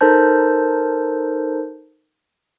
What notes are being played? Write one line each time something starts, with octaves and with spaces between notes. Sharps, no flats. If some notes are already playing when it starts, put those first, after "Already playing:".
D#4 A4 A#4 C5 A5 G6